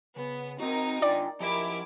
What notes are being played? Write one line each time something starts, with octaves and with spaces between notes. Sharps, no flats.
C#3 B3
C4 D#4 F#4 A#4
D4 F4 D5 G5
F3 E4 G4 A#4 D#5 D6